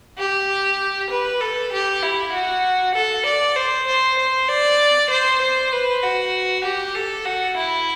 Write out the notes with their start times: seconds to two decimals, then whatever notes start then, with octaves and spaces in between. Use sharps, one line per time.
0.18 G4
1.11 B4
1.41 A4
1.73 G4
2.03 E4
2.33 F#4
2.95 A4
3.27 D5
3.56 C5
3.88 C5
4.19 C5
4.49 D5
5.10 C5
5.42 C5
5.73 B4
6.03 F#4
6.65 G4
6.95 A4
7.25 F#4
7.57 E4